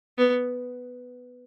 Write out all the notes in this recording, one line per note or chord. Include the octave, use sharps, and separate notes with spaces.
B3